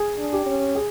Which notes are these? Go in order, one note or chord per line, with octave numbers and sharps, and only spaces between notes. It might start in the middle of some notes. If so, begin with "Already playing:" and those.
Already playing: G#4
D4
G4
C#4
G#4